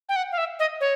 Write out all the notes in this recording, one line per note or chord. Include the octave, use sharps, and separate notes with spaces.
G5
F#5
F5
E5
D#5
C#5